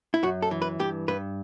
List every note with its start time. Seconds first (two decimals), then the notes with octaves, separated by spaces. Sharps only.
0.14 E4
0.23 F#2 F#4
0.42 A4
0.51 E3
0.62 B4
0.79 G2 G4
1.08 G2 B4